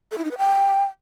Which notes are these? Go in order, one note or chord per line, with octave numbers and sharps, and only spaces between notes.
A4
E4
D#4
B4
G5